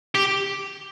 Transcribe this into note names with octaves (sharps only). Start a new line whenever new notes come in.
G4